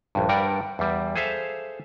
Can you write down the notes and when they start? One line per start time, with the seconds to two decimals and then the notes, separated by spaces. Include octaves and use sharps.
0.15 A#1 G2
0.29 G2 G3 A#4 D5 F#5
0.79 E2 G3
1.16 G#4 A4 C5 E5 F5